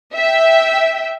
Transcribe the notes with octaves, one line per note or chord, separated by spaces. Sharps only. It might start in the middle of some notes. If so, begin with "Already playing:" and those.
E5 G5